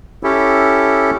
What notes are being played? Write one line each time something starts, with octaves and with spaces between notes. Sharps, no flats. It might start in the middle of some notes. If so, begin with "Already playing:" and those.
C#4 E4 G4 A4